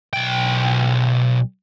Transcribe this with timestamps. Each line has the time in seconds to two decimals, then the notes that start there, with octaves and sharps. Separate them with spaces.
0.13 B1 G5